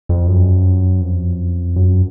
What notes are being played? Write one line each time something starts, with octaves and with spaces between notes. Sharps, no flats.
F2
F#2
F2
F#2